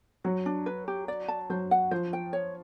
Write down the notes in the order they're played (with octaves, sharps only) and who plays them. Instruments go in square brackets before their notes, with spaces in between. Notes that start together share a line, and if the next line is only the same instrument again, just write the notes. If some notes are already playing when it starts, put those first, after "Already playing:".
[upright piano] F#3 [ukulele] F#4
[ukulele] D4
B4
G4
D5
A5
[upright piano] F#3 [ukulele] C5
[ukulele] F#5
[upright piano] F3 [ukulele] C5
[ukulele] G5
C#5